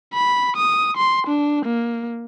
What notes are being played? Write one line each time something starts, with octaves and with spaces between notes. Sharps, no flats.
B5
D#6
C6
D4
A#3